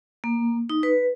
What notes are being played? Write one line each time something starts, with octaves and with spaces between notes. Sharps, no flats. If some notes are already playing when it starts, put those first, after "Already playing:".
A#3
D#4
B4